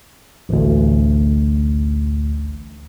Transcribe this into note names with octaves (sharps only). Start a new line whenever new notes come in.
A1 D2